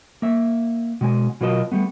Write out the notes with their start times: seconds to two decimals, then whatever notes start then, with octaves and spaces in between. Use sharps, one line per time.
0.22 A#3 E5
1.01 B2 G#3 G#5
1.41 B2 F#3 F4 A#4 D#5 A5
1.72 G3 A3 B3